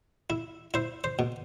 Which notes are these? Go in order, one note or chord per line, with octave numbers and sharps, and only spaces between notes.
E4
E4 C5
C5
B2